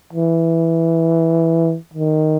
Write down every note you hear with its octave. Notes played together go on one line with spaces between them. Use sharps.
E3
D#3